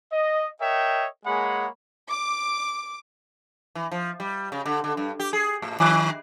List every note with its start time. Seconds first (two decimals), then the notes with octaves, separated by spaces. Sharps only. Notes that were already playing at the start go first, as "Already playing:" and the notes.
0.12 D#5
0.61 A#4 C#5 D#5 E5 G5
1.25 G#3 A#3 G#4 C#5 F#5 B5
2.10 D6
3.75 E3
3.92 F3
4.20 G3
4.52 C#3
4.65 D3
4.84 D3
4.97 G2
5.20 G4
5.33 G#4
5.62 A2
5.80 D#3